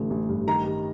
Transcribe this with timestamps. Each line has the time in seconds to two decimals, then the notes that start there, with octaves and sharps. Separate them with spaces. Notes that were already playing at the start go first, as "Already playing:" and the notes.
Already playing: A1 D3
0.10 A1
0.29 G2
0.47 D#3 A#5
0.65 G3